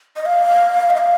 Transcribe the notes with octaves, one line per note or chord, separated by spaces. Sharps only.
D#5
F5
D#5
F5